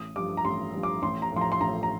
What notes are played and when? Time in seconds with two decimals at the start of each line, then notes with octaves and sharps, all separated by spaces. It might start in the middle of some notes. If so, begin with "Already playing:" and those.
Already playing: A1 D#6
0.16 G2 F3 D6
0.37 A#5
0.45 A1 C6
0.74 G2 F3
0.83 D6
1.02 A1 C6
1.22 A#5
1.32 A2 F3 C6
1.41 A#5
1.52 C6
1.60 A1 A#5
1.83 A#5